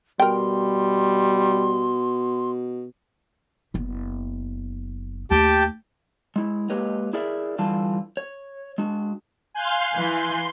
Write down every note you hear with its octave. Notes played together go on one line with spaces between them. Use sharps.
B2 G3 A#4 G5 C6
F#1 B3
D#2 A3 G4 G5 A5
G#3 E4
G#3 A#3 G4 B4 C#5 D#5
E4 G#4 A#4 D5 E5
D3 E3 G3 F4 A5
C#5
G#3 D4 F#4
F5 G#5 C6 F#6 G6
E3 C6